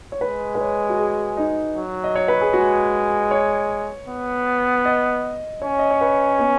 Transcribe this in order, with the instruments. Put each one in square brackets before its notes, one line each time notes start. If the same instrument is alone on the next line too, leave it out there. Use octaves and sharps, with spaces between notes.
[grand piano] C#5
[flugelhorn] G#3 [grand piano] B4
[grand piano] B4
C#5
F#4
G#4
D#4
[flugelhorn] F#3
[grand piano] D#5
C#5
B4
G#4
[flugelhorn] G#3 [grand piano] F#4
[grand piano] C#5
[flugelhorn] B3
[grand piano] D#5
[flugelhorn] C#4 [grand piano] C#5
[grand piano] D#5
C#5
B4
B3